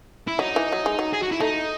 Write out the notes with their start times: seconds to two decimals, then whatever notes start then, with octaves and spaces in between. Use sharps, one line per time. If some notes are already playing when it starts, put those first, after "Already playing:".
0.27 E4
0.39 F#3 D#4
0.56 E3
0.72 F#3
0.86 G#3
0.99 F#3
1.13 G#4
1.23 F#4
1.32 E4
1.40 A3 D#4